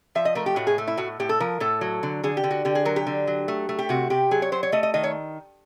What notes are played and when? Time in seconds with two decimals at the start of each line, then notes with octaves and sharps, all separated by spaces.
0.15 F3 E5
0.25 D#5
0.35 A3 A#4
0.46 G4
0.56 A2 F#4
0.67 G#4
0.78 A3
0.87 E4
0.97 A2 F#4
1.20 A2 G4
1.29 A4
1.40 F3 A#4
1.60 A2 A4
1.81 F#3
2.03 D3
2.23 D3 G#4
2.37 G4
2.44 D3
2.51 F#4
2.65 D3 G4
2.75 G#4
2.85 F#3 A#4
2.96 G4
3.07 D3
3.27 F#3
3.48 A3
3.69 A3
3.79 G4
3.89 C3 F#4
4.10 C3 G4
4.31 F#3 G#4
4.42 C#5
4.52 F#3 C5
4.63 C#5
4.72 A3 D#5
4.83 D#5
4.94 D#3 D#5
5.04 C#5